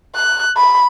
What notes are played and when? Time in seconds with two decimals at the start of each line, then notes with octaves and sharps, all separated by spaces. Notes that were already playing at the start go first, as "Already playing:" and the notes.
0.15 F#6
0.57 B5